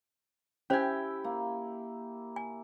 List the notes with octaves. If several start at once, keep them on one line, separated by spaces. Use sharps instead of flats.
C#4 E4 G4 C5 E5 G5 G#5
A#3
G#5